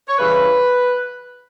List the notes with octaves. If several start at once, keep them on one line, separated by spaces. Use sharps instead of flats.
C#5
C#3 E3 G3 B4